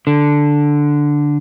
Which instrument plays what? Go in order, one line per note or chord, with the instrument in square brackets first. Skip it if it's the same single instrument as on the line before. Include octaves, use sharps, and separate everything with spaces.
[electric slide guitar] D3